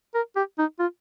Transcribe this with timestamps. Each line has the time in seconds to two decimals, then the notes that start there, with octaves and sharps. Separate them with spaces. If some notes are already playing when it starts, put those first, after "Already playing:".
0.15 A#4
0.36 G4
0.58 D#4
0.80 F4